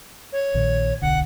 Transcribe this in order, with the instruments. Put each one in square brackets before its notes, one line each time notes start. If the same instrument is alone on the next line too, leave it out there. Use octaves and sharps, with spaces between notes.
[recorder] C#5
[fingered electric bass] A#1 A#2 D#3
[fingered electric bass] D1 B1 D3 [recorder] F#5